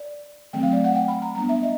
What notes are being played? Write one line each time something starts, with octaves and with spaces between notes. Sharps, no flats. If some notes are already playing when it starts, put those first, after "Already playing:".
Already playing: D5
D#3 F#3 A3 C4 G5
F5
D5
F#5
G5
B5
A#5
G3 B3 D4 A#5
E5
D#5